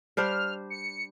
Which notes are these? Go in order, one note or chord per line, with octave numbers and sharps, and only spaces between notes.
G3 D4 C5 F6
C#7